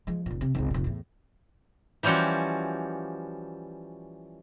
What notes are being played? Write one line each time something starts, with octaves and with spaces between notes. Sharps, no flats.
F3 G#3
F1 A#2
C3
G#1 C#2
F1 A#2
E2 A2
E3 F3 G3 C#4 F#4